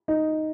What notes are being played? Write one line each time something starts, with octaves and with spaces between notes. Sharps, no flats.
D#4